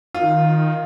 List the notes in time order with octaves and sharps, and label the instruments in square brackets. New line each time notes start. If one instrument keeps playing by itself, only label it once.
[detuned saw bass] D#3 [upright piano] F4